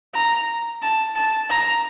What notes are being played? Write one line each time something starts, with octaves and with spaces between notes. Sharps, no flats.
A#5
A5
A5
A#5